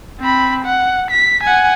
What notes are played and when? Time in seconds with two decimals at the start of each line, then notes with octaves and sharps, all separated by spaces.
0.21 C4 B5
0.65 F#5
1.10 B6
1.43 F#5 G#5